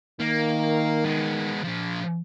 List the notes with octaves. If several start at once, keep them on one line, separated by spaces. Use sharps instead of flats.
D#3 A#3
G#3 B3
A#2 F3